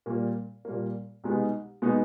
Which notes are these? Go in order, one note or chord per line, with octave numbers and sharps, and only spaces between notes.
A#2 G3 A#3
A#2 G3 A#3
C2 B2 G#3 B3 D#4
B2 G#3 B3 D#4